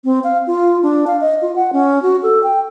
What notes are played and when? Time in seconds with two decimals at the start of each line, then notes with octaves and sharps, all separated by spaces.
0.04 C4
0.24 F5
0.47 F4
0.83 D4
1.07 F5
1.21 D#5
1.42 F4
1.56 F#5
1.73 C#4
2.02 F#4
2.23 A4
2.43 G5